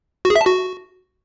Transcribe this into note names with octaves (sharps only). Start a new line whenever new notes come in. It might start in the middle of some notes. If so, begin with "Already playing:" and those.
F#4
G#4
E5
A5
F#4